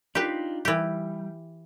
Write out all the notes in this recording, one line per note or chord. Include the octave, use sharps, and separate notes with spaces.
D4 D#4 F4 G4 B4
E3 G3 G4